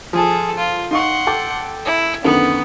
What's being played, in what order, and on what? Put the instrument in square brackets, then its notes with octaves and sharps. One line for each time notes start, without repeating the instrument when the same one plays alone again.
[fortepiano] F3 A5 [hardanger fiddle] G#4 A4
[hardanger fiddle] F4
[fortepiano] D#4 F5 C#6 [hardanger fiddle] F#5 C6
[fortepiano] A4 G5 D6
[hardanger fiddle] E4
[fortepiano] F#2 D3 D#3 [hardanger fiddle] B3